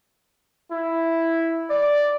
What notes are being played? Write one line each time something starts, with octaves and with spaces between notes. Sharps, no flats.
E4
D5